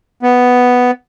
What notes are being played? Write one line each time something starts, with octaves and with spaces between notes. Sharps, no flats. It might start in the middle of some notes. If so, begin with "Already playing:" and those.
B3